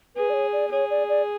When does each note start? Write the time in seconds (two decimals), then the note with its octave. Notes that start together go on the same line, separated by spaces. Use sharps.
0.16 G#4 B4
0.30 D5
0.34 C#5
0.53 D5
0.72 G#4 C#5
0.90 D5
1.09 D5